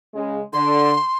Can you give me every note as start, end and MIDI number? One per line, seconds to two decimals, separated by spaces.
0.14 0.40 49
0.14 0.40 56
0.53 0.94 50
0.53 1.18 84